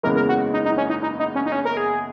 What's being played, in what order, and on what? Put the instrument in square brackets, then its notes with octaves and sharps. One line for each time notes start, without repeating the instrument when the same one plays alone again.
[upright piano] F#1 E2 C#3 E3 G#3 [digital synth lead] A#4
[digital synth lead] A#4
F#4
D#4
D#4
C#4
D#4
D#4
D#4
C#4
D#4
C#4
A#4
G#4